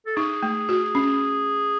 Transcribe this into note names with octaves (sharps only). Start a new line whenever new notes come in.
A4
D#4 G#4
A3
F#4
C#4